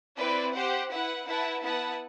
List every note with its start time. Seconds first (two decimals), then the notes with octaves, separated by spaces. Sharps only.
0.18 C4 E4 B4 D5
0.54 G4 C5 F#5
0.90 E4 B4 F#5
1.26 E4 B4 F#5 A5
1.62 B3 E4 B4 F#5 A5